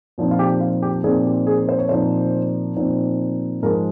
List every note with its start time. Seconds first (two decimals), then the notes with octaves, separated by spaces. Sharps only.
0.18 A#2 F3 C4 D#4
0.31 F4
0.39 G4
0.61 F4
0.82 G4
1.04 A#2 F3 C4 D#4 G#4
1.25 G4
1.47 G#4
1.69 C5
1.79 C#5
1.89 A#2 F3 C4 D#4 C5
2.76 A#2 F3 C4 D#4
3.62 G#2 F3 G#3 A#4